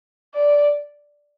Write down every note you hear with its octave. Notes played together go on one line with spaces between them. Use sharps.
D5